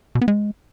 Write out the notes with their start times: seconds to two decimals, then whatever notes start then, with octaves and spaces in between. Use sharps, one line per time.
0.15 B2
0.21 B3
0.28 G#3